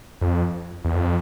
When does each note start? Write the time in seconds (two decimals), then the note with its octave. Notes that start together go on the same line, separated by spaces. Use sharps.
0.21 F2
0.85 E2
0.94 F2